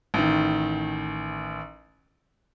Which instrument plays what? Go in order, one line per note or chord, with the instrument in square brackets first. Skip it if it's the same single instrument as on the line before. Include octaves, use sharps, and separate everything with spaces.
[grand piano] A1 D#3